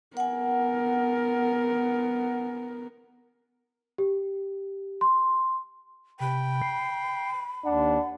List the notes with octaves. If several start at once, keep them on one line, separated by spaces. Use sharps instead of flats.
B3 A#4 F#5 G#5
G4
C6
C3 G5 B5
C7
D#2 D4 F#5